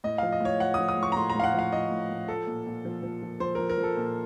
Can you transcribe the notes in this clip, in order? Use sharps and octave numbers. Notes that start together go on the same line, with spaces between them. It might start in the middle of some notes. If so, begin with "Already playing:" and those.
A2 D#5
F3 F5
D#5
A2 C#5
F3 F#5
F3 D#6
D#6
A2
C#6
A#5
A2 C6
A2 A#5
F5
F#5
F3 F5
F3 D#5
A2
A2
F3 A4
A#2
A#2
F3
F3
F3
F3 C5
F3 A#4
A#4
F3
A4
A#2